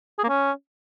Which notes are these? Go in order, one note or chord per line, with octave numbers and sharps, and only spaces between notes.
G#4
A#3
C#4